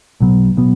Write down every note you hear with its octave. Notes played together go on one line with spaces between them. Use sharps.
B1 B2 F#3 B3
B2 F#3 B3